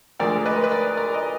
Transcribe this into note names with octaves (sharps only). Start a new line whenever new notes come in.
D2 D3 F3 G#3 A#4 D5
B4 D#5
A#4
B4
A#4 D5
A#4 D5
D#5